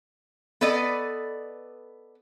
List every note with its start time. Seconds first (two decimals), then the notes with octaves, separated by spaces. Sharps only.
0.61 B3 A4 B4 D5 D#5